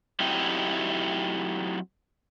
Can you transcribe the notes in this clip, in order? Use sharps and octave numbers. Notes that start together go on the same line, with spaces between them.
F#3 A3 C4 D#4 E4 G4